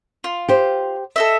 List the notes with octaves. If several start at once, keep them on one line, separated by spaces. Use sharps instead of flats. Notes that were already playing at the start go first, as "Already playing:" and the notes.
F4
G4 C5
A4 D#5 E5